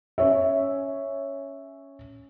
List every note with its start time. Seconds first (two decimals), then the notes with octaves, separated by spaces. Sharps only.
0.18 C#4 C#5 E5